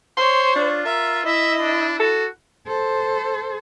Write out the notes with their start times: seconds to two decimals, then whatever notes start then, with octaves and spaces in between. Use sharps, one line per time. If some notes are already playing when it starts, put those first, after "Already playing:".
0.17 C5 C#5 C6
0.56 D4 F4
0.85 A#4 E5
1.26 E4 D#5 E5
1.59 D4
2.00 F#4 A4
2.66 A4 C5